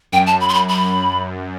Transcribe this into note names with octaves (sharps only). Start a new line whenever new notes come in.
F#2 G5
A5
B5
C6
B5
B5